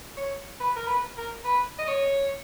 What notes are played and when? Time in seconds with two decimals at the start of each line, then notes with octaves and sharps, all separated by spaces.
0.17 C#5
0.60 B4
0.76 A#4
0.88 B4
1.17 A#4
1.44 B4
1.78 D#5
1.88 C#5